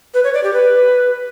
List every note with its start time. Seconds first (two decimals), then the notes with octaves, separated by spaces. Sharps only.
0.14 B4
0.24 C#5
0.34 D5
0.43 G4
0.53 B4